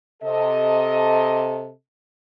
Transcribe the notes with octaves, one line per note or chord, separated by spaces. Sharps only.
C3 A4 D#5